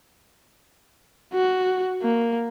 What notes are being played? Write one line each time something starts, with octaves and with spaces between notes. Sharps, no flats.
F#4
A#3